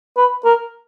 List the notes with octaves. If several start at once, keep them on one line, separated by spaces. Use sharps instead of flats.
B4
A#4